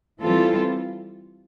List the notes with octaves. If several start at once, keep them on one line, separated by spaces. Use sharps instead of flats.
E3 G3 C4 F4 A4